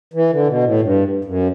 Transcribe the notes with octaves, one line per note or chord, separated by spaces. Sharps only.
E3
D3
B2
A2
G2
F#2